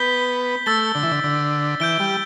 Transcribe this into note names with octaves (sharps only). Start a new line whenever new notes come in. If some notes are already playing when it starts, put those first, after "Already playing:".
Already playing: B3 G6 B6 G7
A3 E6 A6 G7
D3
E3
D3
D3
E3 G6 D7 G7
G3